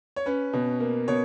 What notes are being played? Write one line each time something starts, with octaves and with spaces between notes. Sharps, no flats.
C#5
C#4 B4
B2
A#3
B2 C#5